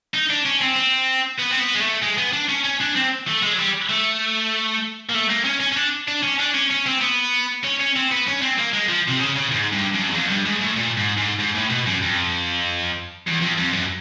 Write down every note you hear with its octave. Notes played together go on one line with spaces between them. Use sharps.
D#4
D4
C#4
C4
C4
B3
C4
B3
G#3
A3
G#3
B3
D4
C#4
C#4
D4
C4
A3
G#3
F#3
G3
A3
A#3
A3
A#3
C#4
C#4
C#4
D4
D4
C#4
D4
C#4
C#4
C4
B3
C#4
C#4
C4
B3
C#4
C4
A#3
G#3
F3
C3
C#3
C#3
G#2
G2
F#2
E2
F2
G2
G#2
A2
A#2
G#2
G#2
G#2
A2
B2
F#2
F2
E2
F2
F2
F#2